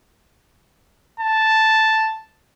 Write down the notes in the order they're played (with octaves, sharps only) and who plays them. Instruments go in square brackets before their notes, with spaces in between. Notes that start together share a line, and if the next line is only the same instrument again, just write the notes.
[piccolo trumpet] A5